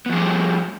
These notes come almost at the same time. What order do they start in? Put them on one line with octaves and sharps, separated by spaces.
B3 F3 G#4 G3 A3